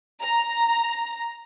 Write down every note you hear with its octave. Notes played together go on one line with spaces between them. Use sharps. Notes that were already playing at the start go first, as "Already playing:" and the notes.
A#5